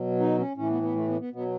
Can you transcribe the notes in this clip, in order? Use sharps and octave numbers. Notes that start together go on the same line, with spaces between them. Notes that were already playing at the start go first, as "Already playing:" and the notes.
Already playing: B2 F#3
D#4
C#4
A2 E3 C#4
B3
B3
A3
B3
B3
B2 F#3 B3